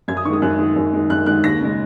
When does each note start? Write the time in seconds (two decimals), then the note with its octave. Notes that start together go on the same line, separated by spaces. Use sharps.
0.08 F#2 G#6
0.17 D#6
0.25 D#3 C#6
0.30 G#3 D#6
0.42 F#2 F#6
0.59 D#3 G#3
0.76 F#2
0.93 D#3 G#3
1.10 F#2 F#6
1.26 D#3 G#3 F#6
1.44 D#2 A#6
1.61 C#3 G#3